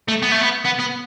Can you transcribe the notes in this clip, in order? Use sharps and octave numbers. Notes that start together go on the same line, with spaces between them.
A3
B3
A3
B3
B3
B3